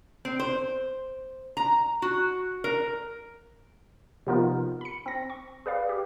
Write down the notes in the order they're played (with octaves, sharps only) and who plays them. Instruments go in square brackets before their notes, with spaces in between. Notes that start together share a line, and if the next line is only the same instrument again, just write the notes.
[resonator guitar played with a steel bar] C4
C5
A#5
F#4
A#4
[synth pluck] C3 F3 B3 D#4 F4 A#4
B5 C#7
C4 A#6
C#6
G#4 B4 D5 F5
G4